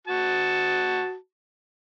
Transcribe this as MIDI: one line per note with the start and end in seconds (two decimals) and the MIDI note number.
0.07 1.14 66
0.07 1.14 81